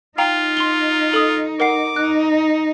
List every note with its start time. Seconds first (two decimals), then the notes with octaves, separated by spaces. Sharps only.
0.18 D#4 F4 F5 G5 A#5
0.57 C6 F7 G7
1.13 A4 D#6
1.60 A#4 F#5 D6 C7
1.96 D#4 F#6